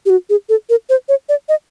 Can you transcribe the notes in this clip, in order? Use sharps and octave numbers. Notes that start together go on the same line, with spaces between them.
G4
F#4
G#4
A4
A#4
C5
C#5
D5
D#5